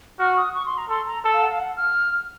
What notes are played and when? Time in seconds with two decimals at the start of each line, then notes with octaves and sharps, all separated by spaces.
0.19 F#4 F6
0.37 D#6
0.55 C#6
0.66 C6
0.78 A#5
0.89 A4 C6
1.07 A#5
1.25 A4 A5
1.33 F5
1.42 F#5
1.51 F5
1.60 F#5
1.77 F6